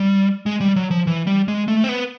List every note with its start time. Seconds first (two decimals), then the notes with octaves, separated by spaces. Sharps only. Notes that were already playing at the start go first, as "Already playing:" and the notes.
Already playing: G3
0.46 G#3
0.61 G3
0.76 F#3
0.91 F3
1.07 E3
1.27 G3
1.48 G#3
1.68 A3
1.84 C4
1.89 B3